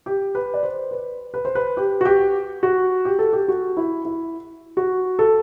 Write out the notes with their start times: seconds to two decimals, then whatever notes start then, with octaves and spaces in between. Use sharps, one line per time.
0.06 G4
0.35 B4
0.54 D5
0.63 C5
0.91 B4
1.34 B4
1.45 C5
1.55 B4
1.77 G4
2.01 F#4
2.05 G4
2.63 F#4
3.05 G4
3.19 A4
3.33 G4
3.48 F#4
3.77 E4
4.05 E4
4.77 F#4
5.19 A4